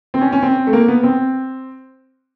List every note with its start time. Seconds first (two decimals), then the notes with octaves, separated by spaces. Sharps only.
0.14 C4
0.21 C#4
0.32 C#4
0.43 C4
0.67 A3
0.73 A#3
0.88 B3
1.03 C4